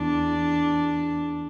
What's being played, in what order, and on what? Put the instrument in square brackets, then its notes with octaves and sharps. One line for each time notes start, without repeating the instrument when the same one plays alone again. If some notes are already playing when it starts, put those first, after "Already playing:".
Already playing: [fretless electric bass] E2 [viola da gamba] D4